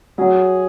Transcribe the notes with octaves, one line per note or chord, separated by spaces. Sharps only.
F#3 G#4